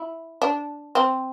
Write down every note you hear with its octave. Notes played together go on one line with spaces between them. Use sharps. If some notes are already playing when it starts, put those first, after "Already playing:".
Already playing: E4
D4
C4